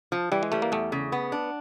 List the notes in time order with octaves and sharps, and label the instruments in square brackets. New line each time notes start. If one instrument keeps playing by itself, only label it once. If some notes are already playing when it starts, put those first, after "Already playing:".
[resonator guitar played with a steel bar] F3
[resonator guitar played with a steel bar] E3 [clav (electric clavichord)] G3
[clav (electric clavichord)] G#3
[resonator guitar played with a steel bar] G3 [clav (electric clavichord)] A3
[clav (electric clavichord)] A#3
[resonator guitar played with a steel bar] E2 [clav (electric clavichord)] A3
[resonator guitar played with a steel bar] C#3
B3
D4